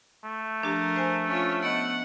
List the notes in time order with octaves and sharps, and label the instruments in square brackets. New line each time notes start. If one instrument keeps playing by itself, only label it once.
[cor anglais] A3
[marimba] F3 D4 G4 [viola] A#4
[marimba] C5 G#5
[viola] C#4 F4
[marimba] B3 D#5 [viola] F#5